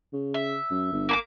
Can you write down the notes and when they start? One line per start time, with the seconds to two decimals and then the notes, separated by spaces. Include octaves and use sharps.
0.13 C#3
0.34 E5
0.70 F#2
0.93 G1
1.09 A#3 B5 D6